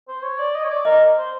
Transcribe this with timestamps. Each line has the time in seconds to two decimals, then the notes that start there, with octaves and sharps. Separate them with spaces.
0.08 C5
0.22 C#5
0.38 D5
0.55 D#5
0.64 C#5
0.70 D5
0.85 A#4 D#5
1.17 C5